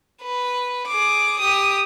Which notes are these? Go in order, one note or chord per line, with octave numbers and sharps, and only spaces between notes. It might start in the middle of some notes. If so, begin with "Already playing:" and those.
B4
G#4 D6
G4 D#6